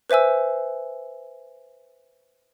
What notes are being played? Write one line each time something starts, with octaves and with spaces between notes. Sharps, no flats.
B4 C5 E5 G#5 E6